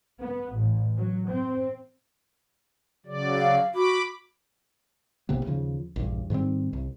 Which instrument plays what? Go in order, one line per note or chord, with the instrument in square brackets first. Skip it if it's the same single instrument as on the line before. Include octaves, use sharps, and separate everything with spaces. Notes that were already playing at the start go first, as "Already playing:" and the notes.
[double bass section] B3
A1
F#3
C4
[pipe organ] C#3 F#3 D5
[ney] F5
[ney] F#4 [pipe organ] B5 D6
[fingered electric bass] B1 C3 A#3 B3
D#2 C#3 F3
A#1 E2 G2
G#2 D#3 G3 C4
C2